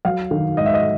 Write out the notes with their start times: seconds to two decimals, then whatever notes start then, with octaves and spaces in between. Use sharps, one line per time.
0.05 F#3 F5
0.31 D#3
0.57 G#2 D#5
0.66 E5
0.74 D#5